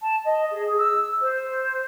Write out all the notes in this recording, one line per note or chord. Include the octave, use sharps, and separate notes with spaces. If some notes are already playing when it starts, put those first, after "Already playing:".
A5
D#5
G#4
E6
C5